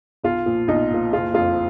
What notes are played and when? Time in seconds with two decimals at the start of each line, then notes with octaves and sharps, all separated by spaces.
0.24 B1 F4
0.46 A#2 F3
0.68 B1 D#4
0.91 A#2 F3
1.12 F#1 F4
1.34 F2 F3 F4